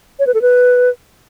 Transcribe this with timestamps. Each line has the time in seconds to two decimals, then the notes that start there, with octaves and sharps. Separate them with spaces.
0.19 C#5
0.27 B4
0.34 A4
0.42 B4